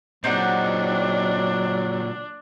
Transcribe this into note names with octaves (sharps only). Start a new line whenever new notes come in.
A#2 F#3 G#3 C4 D4 D#4 F#5